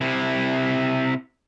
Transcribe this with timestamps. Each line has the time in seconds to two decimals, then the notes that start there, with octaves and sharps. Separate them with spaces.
0.01 C3 E4